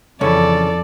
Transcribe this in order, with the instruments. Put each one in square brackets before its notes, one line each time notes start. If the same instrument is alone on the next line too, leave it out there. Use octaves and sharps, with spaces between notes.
[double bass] F2 [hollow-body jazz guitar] C#3 E3 [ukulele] C#4 [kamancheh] A4 D5